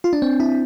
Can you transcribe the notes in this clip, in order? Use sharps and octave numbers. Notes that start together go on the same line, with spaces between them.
F4
D4
C4
E4